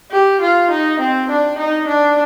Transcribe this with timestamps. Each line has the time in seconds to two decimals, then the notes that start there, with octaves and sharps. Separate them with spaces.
0.12 G4
0.41 F4
0.71 D#4
1.00 C4
1.30 D4
1.58 D#4
1.88 D4